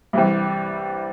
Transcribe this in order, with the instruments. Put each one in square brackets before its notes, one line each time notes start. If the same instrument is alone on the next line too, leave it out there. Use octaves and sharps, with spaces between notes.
[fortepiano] C2 C3 E3 G3